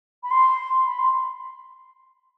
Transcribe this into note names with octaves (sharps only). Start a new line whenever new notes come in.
B5
C6
B5
C6